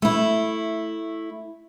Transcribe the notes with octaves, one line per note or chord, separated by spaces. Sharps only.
A3 E4